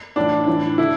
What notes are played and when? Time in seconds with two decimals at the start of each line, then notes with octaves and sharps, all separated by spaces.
0.16 A2 E3 D4
0.47 A2 E3
0.78 D3 E4